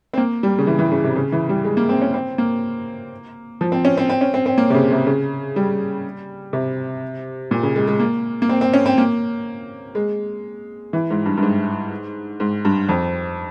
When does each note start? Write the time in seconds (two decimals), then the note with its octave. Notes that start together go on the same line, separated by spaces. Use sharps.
0.13 C4
0.18 A#3
0.43 G3
0.58 C#3
0.67 E3
0.79 E3
0.92 C#3
1.04 C3
1.16 C#3
1.32 E3
1.49 G3
1.64 G#3
1.77 A#3
1.89 C4
2.02 C#4
2.14 C4
2.38 A#3
3.61 F3
3.72 C4
3.85 C#4
3.97 C4
4.09 C4
4.21 C#4
4.34 C4
4.46 C4
4.58 A#3
4.70 C3
4.74 C#3
4.91 C3
5.07 C#3
5.56 G3
6.53 C3
7.51 A#2
7.63 C#3
7.76 G#3
7.87 G#3
8.00 A#3
8.42 A#3
8.49 C4
8.61 C4
8.74 C#4
8.86 C4
8.98 A#3
9.95 G#3
10.93 E3
11.10 G#2
11.26 G2
11.38 G2
11.42 G#2
12.40 G#2
12.65 G2
12.89 F2